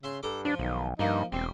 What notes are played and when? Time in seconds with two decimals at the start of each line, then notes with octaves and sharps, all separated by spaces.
0.03 C#3 E5 C6
0.23 G2 A4 A#5 D6
0.45 F3 D4
0.59 B1 D#3
0.99 G2 F3 A#3 D#4
1.32 E1 G3 C4